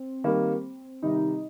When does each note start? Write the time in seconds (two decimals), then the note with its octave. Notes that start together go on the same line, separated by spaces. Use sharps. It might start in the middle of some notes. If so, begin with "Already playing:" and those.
Already playing: C4
0.24 D#3 G3 A#3
1.03 C3 D#3 G3 D#4